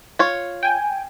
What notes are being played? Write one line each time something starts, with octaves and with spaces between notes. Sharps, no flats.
F4 C#5
G5 G#5